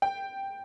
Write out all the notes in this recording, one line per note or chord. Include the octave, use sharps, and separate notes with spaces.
G5